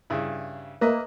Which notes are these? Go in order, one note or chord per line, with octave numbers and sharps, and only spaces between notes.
G2 C#3 E4
A#3 B4 D#5 E5